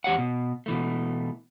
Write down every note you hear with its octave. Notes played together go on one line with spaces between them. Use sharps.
E2 G4 C#5 F#5
B2
B2 E3 A3